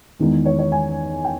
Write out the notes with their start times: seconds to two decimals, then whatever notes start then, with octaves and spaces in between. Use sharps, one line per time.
0.19 E2 D#3 G#3
0.45 C#5
0.59 C#5
0.72 G#5
1.25 G5